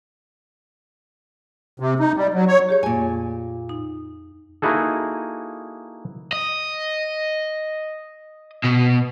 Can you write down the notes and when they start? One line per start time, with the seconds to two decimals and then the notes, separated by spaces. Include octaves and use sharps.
1.80 C3
1.99 D#4
2.16 G3
2.34 F#3
2.48 C#5
2.69 G4 G#4 C#5
2.83 F2 A#2 G#5
3.69 D#4
4.62 A#3 D#4 E4 F#4 G#4 A4
6.33 D#5
8.65 B2